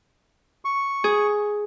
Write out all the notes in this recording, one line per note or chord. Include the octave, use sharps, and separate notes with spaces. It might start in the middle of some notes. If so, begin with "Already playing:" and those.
C#6
G#4